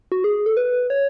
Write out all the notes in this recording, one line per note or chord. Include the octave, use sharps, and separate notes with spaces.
F#4
G#4
A4
B4
C#5